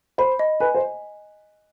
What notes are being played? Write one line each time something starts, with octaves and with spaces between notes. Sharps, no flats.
C5 B5
D#5
B4 G#5
C5